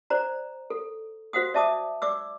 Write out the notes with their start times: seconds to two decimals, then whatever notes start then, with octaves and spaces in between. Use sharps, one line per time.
0.10 C5 D5 A#5
0.70 A4
1.33 F#4 C5 F5 F#5 D#6
1.54 D5 E5 A5 D6 D#6
2.02 D5 D6 E6